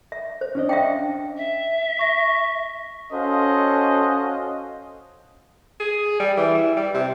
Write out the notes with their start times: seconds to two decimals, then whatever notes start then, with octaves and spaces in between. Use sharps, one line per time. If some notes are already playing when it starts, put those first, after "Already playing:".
0.12 E5
0.41 C5
0.55 C#4 D4 D#5
0.69 E5 F5 G5
1.37 E5
1.99 C#6 A#6
3.13 C#4 F#4 A4 C5 D#5 F5
5.80 G#4
6.20 G3
6.37 E3
6.55 E4
6.77 G3
6.94 C3